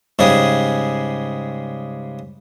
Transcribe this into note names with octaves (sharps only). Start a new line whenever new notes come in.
G#2 C#3 G3 G#4